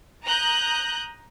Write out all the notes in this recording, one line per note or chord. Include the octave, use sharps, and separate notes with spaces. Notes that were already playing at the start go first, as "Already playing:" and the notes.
A#5 D#6 F#6 G6